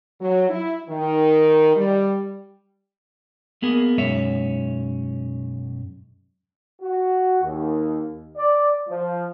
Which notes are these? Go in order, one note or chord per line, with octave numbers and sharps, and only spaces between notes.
F#3
E4
D#3
G3
A#3 B3 G#4 A#4
B1 F#2 G#3 C#4 C#5 E5
F#4
D#2
D5
F3